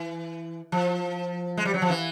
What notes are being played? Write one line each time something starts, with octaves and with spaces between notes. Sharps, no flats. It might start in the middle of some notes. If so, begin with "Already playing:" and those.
Already playing: E3
F3
G#3
G3
F#3
F3
E3